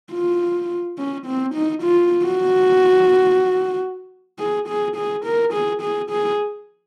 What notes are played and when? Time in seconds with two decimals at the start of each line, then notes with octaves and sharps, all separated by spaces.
0.13 F4
0.98 C#4
1.26 C4
1.54 D#4
1.83 F4
2.26 F#4
4.39 G#4
4.68 G#4
4.96 G#4
5.25 A#4
5.53 G#4
5.82 G#4
6.11 G#4